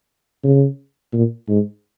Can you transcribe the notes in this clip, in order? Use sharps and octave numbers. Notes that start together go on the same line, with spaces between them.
C#3
A#2
G#2